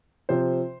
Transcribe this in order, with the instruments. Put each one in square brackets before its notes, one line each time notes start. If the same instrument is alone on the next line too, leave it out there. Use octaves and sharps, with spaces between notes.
[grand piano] C3 F3 C5